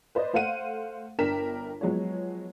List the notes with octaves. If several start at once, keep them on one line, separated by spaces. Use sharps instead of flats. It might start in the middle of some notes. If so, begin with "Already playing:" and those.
B4 C5 D5 D#5
A3 C5 F5 F#5 D#7
G1 D4 A#4 G5 B6 E7
F3 F#3 G#3 B3 C#5